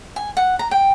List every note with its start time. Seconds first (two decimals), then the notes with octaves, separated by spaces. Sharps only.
0.16 G#5
0.37 F#5
0.59 A#5
0.71 G5